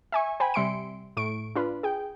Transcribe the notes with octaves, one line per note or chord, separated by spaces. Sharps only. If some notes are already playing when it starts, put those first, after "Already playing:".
E5 G#5 C#6
C5 G5 G#5 B5
C3 G3 E5 C6 C#7 D7
A2 C#6 D7
D4 F4 B4
G#4 G5